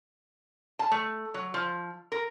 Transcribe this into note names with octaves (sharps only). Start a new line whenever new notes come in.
A5
A3
F#3
F3
A#4